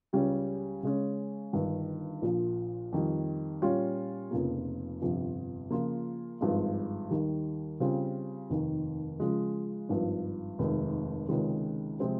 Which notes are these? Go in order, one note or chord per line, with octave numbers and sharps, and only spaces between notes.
C#2 C#3 G3 C#4 G4
C#3 G#3 C#4
G1 G2 D#3
A#1 A#2 F3
F2 D#3 G3
A#2 G3 C#4 F4
F1 F2 C#3 F3 A#3
G1 F2 C3 F3
C#3 F3 A#3 F4
G#1 G2 F3 G#3
D#2 D#3 G3
C#3 G3 C4 F4
F1 D#2 D#3
C#3 F3 G#3
G#1 G2 F3
F1 D#2 D#3 G#3 D#4
C#2 C3 D#3 G#3 C#4
C3 F3 G#3 C4 F4